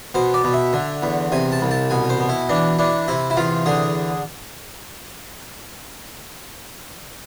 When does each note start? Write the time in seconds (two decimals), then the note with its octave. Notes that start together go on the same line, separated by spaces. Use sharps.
0.15 B2 C5
0.34 D5
0.44 B2
0.54 E5
0.73 D3
1.03 E2
1.32 C3 G#5
1.52 A5
1.61 C2
1.71 A5
1.90 B2 G#5
2.10 C5
2.20 B2
2.29 E4
2.49 E3 D4
2.79 E3 D4
3.08 C3 E4
3.30 E4
3.37 E2 F4
3.66 D3 G#4